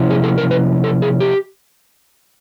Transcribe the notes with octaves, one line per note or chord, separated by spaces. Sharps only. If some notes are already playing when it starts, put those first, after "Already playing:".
Already playing: C3 F3 A#3 C#4 E4
G#4
A4
A#4
B4
A4
G#4
G4